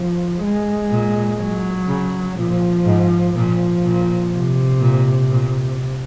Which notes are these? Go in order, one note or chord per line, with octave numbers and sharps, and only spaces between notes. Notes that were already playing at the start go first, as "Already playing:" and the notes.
Already playing: F3
G#3
A#2
F#3
C#3
A#2 F3
G#2
A#2 F3
A#2
C3
A#2
A#2